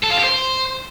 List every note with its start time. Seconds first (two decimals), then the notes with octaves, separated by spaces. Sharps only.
0.03 A4
0.10 F4
0.17 G4
0.24 C5